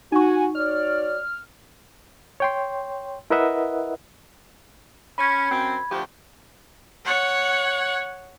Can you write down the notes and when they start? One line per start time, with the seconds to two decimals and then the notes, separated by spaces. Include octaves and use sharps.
0.12 D#4 F#4 G#5 C#6
0.55 F#4 C#5 D5 F6
2.40 C#5 G5 C6
3.30 E4 A#4 B4 D#5 E5 F#5
5.18 C#4 B5 G#6
5.50 F#2 C4
5.89 D2 F3 G4
7.05 C#5 F#5